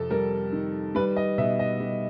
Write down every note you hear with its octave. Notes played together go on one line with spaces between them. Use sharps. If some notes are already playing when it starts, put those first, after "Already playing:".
Already playing: F2 C3 A4
G3 A#4
D#3
G3 B4
D#5
B2 E5
D#5
G3